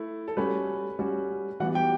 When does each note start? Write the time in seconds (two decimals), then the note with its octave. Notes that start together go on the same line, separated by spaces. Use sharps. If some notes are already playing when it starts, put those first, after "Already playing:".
Already playing: A3 E4
0.28 A4
0.37 G3 C#4 F#4 B4
0.99 G3 C#4 F#4
1.60 E3 G3 B3 F#4 F#5
1.75 G4 G5